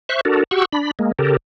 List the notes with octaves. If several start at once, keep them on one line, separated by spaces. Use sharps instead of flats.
C5 E5 C#6 F#6
D4 F#4 A4 A#4
F#4 G4 F#5 C#6 E6
D4 B5
G#3 A#3
C#3 G4 A4 A#4